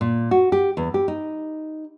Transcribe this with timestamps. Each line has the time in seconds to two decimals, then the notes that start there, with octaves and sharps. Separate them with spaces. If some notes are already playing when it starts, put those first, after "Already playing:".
0.01 A#2
0.31 F#4
0.52 G4
0.77 E2
0.94 G4
1.08 D#4